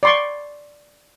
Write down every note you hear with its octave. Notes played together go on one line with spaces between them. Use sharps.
D5 C6 C#6